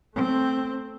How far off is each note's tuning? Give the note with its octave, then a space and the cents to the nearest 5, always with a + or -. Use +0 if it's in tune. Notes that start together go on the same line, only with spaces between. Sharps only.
A3 +0 C4 +0